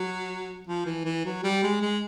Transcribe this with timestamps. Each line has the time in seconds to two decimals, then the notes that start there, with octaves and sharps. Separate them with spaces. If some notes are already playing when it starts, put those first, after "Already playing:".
Already playing: F#3
0.67 F3
0.86 E3
1.05 E3
1.25 F#3
1.44 G3
1.63 G#3
1.82 G#3